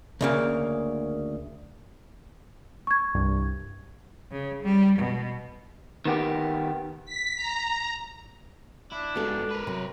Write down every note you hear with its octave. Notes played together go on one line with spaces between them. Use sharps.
D2 C#3 A#3
C#6 G#6
C2 G2
C#3
G3
B2
D#3 B3 G4
B6
A#5
D4 E4
G#2 B3 F#4 A4
A#4 B4
C3 F#3